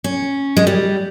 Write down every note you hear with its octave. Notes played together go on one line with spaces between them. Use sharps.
C#4
G#3
G3